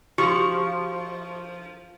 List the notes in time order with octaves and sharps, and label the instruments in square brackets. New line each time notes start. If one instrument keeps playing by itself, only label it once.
[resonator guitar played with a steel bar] F3 [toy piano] F#4 G4 [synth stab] C#6